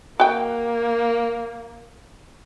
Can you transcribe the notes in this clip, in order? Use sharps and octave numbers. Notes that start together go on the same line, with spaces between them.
A#3 F#4 G5